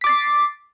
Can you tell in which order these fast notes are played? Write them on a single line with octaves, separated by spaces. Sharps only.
B6 D6 A6 C7